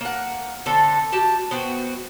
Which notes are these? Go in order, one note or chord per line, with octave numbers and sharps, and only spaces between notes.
A#3 F#5
D3 C4 A4
F#4 G4 A5
B3 C4 F#4 G5